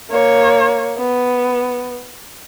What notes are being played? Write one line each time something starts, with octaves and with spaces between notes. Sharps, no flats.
A#3 C#5
B3